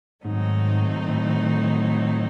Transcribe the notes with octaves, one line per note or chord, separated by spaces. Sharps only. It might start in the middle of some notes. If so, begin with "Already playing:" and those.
G#2 D#3 F#3 A3 C4 D#4
A2